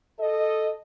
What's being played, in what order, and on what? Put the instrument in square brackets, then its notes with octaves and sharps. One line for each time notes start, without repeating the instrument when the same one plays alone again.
[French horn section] A4 D#5